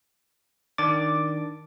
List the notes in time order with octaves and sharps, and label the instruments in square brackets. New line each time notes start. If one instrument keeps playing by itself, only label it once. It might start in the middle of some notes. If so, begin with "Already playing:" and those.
[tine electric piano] D#3 D4 A6 [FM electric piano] D6